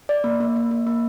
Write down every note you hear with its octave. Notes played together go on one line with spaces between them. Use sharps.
D5
A#3
A#3
A#3
A#3
A#3